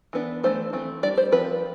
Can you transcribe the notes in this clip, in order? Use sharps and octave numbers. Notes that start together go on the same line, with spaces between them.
E3 B3 D4
E3 A3 D4 C5
E3 A3 C4
G3 D4 D5
C5
F3 C4 B4